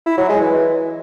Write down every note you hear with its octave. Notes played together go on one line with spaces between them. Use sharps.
E4
F#3
G#3
E3